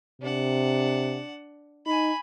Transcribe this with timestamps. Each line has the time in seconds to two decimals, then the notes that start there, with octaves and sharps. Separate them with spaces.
0.22 C3 D4 F#5
1.86 D#4 G#5 B5